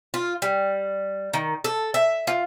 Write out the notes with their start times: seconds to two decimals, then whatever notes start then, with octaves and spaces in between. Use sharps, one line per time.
0.14 F4
0.42 G3
1.34 D#3
1.64 A4
1.94 E5
2.27 F4